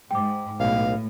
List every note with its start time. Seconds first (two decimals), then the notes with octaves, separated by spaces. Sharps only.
0.11 G#2 G5 D6
0.60 B1 A2 F5